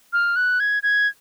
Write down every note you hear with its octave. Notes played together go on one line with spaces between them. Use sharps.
F6
F#6
G#6
G#6